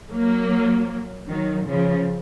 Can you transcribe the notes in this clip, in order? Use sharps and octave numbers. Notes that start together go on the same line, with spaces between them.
F#3 A#3
D#3 F#3
C#3 F3